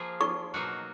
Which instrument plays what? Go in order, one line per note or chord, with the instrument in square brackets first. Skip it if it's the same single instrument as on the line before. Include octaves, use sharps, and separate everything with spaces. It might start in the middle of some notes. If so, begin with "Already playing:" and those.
Already playing: [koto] F3 A#3 F4 G#4
[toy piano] C#6
[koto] B2 F#3 A#3 D#4 F#4